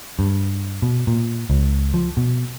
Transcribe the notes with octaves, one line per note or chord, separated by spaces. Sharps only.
G2
B2
A#2
C#2
F3
B2